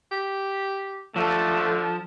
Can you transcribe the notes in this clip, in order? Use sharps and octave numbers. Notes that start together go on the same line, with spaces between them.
G4
D3 F3 A3 A4 A5